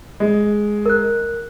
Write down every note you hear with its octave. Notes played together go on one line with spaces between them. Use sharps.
G#3
A#4 F#6